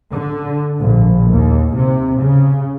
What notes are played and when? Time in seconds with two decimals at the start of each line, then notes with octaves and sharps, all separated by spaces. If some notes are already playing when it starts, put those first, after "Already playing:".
0.12 D3
0.80 A#1
1.31 D#2
1.77 C3
2.22 C#3